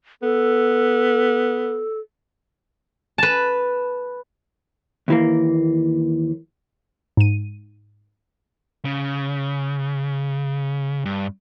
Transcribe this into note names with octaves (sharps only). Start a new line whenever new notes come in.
B3 A4
B4 A5
D#2 E3 A#3
G#2 D#7
C#3
G2